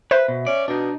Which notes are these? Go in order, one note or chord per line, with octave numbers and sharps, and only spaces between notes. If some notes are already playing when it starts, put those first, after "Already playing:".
B4 C5 E5
B2
C#4 D5
B2 D4 D#4